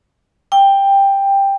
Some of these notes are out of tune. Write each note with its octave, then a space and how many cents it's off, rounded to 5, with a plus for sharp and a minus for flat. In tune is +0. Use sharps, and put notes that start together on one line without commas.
G5 +10